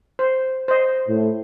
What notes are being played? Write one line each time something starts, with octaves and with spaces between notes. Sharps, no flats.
C5
C5 D#5
A2